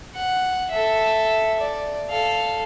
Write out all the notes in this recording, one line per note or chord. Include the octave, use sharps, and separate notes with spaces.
F#5
A4 E5
D5
A4 F5